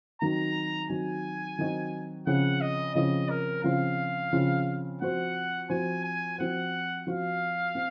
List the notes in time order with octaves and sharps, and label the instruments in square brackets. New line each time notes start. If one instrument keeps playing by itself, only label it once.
[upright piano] D#3 F#3 C4 D#4 F#4 [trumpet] A#5
[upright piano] D#3 F#3 C4 D#4 F#4 [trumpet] G#5
[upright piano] D#3 F#3 C4 D#4 F#4
[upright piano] C#3 F3 C4 F4 [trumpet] F#5
[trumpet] D#5
[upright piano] C#3 F3 C4 F4 [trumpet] D#5
[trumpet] A#4
[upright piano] C#3 F3 C4 F4 [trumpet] F5
[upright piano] C#3 F3 C4 F4
[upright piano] F3 C4 F#4 C5 [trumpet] F#5
[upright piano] F3 C4 F#4 C5 [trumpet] G#5
[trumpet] G#5
[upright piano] F3 C4 F#4 C5 [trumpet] F#5
[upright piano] F3 C4 F#4 C5 [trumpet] F5
[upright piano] C4